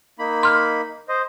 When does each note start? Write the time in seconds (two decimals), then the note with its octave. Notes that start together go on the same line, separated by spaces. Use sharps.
0.19 A#3 D#4 B5
0.43 C6 F6
1.08 C5 D#5